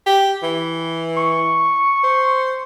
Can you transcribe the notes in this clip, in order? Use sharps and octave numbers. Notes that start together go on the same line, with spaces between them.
G4
E3
C#6
C5